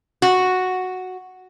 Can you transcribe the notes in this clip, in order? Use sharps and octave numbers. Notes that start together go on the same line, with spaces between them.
F#4